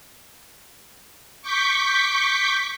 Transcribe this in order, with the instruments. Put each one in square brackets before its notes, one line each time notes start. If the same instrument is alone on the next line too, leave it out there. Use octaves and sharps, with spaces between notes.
[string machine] C#6 D6 G6 B6